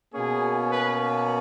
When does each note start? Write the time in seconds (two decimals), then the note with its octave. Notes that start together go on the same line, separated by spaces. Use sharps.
0.13 B2 A#3 C#4 G#4
0.71 B4